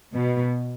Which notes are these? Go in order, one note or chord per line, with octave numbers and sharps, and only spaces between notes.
B2